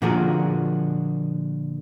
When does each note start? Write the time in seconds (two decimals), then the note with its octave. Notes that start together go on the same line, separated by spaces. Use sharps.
0.02 A#2 D3 F3 F#4 G#4 A#4